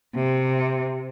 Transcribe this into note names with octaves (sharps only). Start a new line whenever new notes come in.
C3